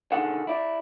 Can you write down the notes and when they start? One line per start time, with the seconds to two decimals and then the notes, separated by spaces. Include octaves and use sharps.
0.12 B1 D3 D#3 G#4 A4 F#5
0.47 E4 D5